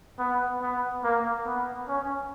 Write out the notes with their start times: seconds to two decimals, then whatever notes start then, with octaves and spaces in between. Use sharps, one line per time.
0.19 B3
0.61 B3
1.03 A#3
1.46 B3
1.88 C#4